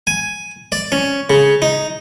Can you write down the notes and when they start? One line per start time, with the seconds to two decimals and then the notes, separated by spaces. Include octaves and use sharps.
0.07 G#5
0.72 D5
0.92 C#4
1.30 C#3
1.62 D#4